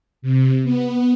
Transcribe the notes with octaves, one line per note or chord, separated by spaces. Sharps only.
C3
B3